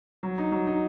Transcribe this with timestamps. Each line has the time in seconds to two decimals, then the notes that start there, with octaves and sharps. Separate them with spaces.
0.23 F#3
0.38 D#4
0.52 F#3
0.67 D#4